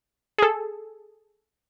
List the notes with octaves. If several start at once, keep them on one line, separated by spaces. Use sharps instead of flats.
G#4 A4